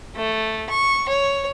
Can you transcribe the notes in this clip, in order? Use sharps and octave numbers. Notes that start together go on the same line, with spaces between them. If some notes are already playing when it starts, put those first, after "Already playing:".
A3
C#6
C#5